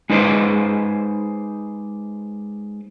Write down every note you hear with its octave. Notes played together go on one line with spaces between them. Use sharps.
G#3 D#4 B4 C5 D5